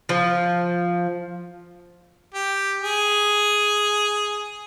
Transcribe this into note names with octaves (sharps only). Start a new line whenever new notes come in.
F3
G4
G#4